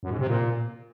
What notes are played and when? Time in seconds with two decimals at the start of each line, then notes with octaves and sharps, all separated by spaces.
0.03 F#2
0.11 G#2
0.19 C3
0.27 A#2